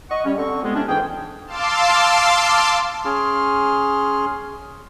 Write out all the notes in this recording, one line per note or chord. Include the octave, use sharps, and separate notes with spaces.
D#5 F#5 C#6
G3 C#4
D3 C4 C#6
F2 G3 G#3 B3
A2 C3 C#4 D4
F2 G#2 E3 C#4 G#4 G5
F5 A5 C6 D6 E6
C#4 G#4 C6 F6